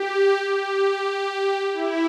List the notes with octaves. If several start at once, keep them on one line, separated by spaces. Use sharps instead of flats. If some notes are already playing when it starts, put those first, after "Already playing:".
Already playing: G4
G4
E4